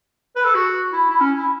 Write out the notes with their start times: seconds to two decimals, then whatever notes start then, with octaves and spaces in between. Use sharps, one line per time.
0.36 B4
0.45 A4
0.55 F#4
0.93 E4
1.11 E4
1.21 C#4
1.36 E4